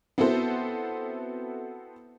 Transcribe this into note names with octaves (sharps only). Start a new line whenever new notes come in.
B3 C4 E4 F#4 A4 C5